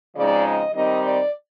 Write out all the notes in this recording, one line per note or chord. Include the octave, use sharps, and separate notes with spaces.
C#3 F3 G#3 C4 D#4 D5
D#5
D#3 G3 C4 D#4 D#5
D5